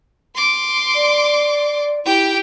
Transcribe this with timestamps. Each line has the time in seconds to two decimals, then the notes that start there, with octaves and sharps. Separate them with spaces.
0.35 C6 D6
0.95 D5
2.05 E4 G4 G5